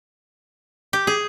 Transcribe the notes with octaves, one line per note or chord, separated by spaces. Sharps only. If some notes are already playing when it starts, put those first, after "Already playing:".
G4
G#4